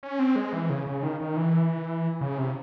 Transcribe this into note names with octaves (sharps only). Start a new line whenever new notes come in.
C#4
C4
G#3
E3
C#3
C#3
D#3
D#3
E3
C#3
C3